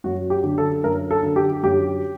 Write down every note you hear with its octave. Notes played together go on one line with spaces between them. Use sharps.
F#2 F#4
G4
D3
A4
F#2 A#4
A4
D3
G4
F#2 G4